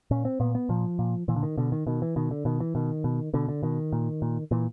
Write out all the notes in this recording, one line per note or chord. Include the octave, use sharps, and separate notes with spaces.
A#2 C#4
C4
A#2 B3
B3
A#2 F3
A#2
A#2 E3
D3
D#3
B2 D3
D#3
B2 D#3
E3
B2 D#3
D3
B2 D#3
E3
B2 D#3
B2
B2 D3
D3
B2 D#3
A#2
A#2
A#2 E3